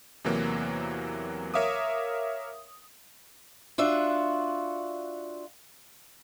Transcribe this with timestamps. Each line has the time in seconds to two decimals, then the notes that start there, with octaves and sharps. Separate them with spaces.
0.24 E2 C3 E3 F#3 A#3
1.54 A#4 C#5 E5 F5 D6 D#6
3.78 D4 F4 F#4 E5